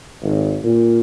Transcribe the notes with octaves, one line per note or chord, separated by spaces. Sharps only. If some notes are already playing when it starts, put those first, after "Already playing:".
G#1
A#2